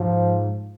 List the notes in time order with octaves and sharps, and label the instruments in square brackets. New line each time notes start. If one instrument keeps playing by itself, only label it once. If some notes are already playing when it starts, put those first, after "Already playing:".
Already playing: [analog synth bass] G#2 [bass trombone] F3